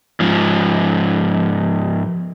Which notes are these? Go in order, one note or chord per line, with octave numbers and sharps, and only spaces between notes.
G#2 F3